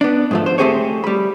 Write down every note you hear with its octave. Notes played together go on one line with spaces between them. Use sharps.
B3 D4
G#2 F3 A3
C5
A3 C4 G4 G#4 C5 C#5
G3 B5